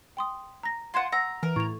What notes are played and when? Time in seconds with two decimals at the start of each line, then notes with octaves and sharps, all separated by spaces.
0.17 G5 C6 D#6
0.63 A#5 A#6
0.94 F4 F#5 C6 G#6 E7
1.12 F#5 A#5 E6 A#6
1.43 E3 A#4
1.56 A2 C#6 F7